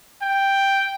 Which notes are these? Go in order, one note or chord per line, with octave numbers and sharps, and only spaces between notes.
G5